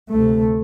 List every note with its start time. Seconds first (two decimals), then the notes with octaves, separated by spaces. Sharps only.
0.11 D2 C3 A3